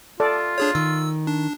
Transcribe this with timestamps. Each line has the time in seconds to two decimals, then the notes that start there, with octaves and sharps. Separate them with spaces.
0.20 F4 A4 D5
0.58 D4 G#4 C#5
0.75 D#3 E6
1.27 D4